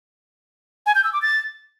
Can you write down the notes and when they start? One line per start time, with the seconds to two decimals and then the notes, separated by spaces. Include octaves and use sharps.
0.86 G#5
0.95 G6
1.04 E6
1.13 D6
1.22 A6